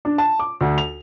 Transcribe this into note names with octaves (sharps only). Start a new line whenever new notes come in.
D4
A5
D6
D2
F7